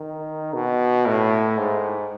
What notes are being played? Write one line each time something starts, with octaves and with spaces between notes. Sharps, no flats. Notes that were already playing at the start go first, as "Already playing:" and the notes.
Already playing: D#3
B2
A2
G#2